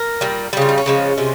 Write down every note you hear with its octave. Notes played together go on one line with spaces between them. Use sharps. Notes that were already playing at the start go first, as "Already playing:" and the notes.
Already playing: A#4
A#2 G3
C#3 G3 F4 G4
D#4
C#4
C#3 F3 G#3
C3 F3 G#3